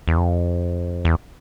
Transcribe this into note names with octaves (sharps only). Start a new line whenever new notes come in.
E2
F2
E2